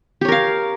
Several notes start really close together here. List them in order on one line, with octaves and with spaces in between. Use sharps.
G4 C#5 A#4 F5